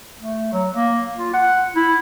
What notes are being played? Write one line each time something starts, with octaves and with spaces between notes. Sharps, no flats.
A3
F#3
A#3
F4
F#5
E4